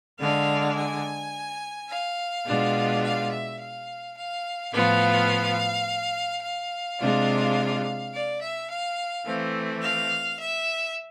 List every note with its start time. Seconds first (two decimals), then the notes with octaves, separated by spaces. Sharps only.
0.19 D3 G#3 D4 F5
0.76 G#5
1.89 F5
2.46 B2 G#3 D4 F4
3.03 F5
3.30 E5
3.59 F5
4.16 F5
4.72 A2 F3 B3 F4 F5
6.42 F5
7.00 C3 G#3 D4 F4
8.13 D5
8.41 E5
8.69 F5
9.26 E3 A3 C4
9.83 F5
10.39 E5